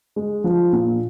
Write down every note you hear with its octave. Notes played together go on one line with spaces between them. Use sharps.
G#3
F3
A#2